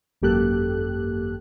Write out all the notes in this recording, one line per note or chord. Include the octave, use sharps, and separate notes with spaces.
G#1 F#2 A#3 G4 A4 F#6